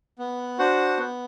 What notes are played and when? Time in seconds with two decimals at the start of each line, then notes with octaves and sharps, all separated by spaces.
0.19 B3
0.59 D4 F#4 C5 F#5
0.98 B3